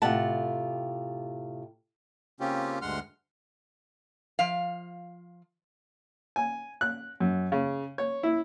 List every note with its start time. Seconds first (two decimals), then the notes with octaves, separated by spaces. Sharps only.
0.02 A2 C3 F4 G4 F#5 A5
2.40 C#3 A#3 C4 C#4 F4 G4
2.82 D2 G2 G#3 F#5 C6 F6
4.39 F3 F5
6.36 G#5
6.81 F#6
7.20 F#2
7.52 C#3
7.98 C#5
8.23 E4